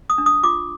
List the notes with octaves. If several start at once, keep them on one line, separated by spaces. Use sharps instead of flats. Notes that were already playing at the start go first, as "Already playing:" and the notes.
D#6
D4
D#6
F4 D6